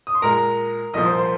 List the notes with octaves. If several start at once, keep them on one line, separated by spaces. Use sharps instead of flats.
D#6
C6
A#2 G#3 A#4 A#5
C2 A#2 F3 A#3 D#5 D#6
C5 C6
C5 C6